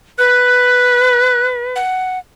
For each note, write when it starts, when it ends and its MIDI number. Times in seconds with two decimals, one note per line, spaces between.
0.18 1.76 71
0.18 1.47 90
1.76 2.19 78